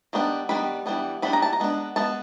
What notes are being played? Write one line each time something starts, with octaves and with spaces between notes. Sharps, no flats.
D#3 G3 B3 D4
D#3 G3 B3 D4 B5
E3 G3 B3 D4
E3 G3 B3 D4 B5
A#5
A5
A#5
G#3 B3 D4
G#3 B3 A5